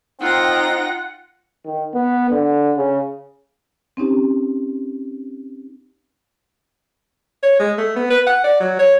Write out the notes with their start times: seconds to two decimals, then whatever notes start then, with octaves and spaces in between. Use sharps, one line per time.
0.20 C4 D#4 F4 F#5 G5 A#6
1.65 D#3
1.94 B3
2.30 D3
2.77 C#3
3.97 C4 C#4 D#4 G4
7.43 C#5
7.59 G#3
7.78 A3
7.96 B3
8.10 B4
8.27 F#5
8.44 D5
8.60 F#3
8.79 C#5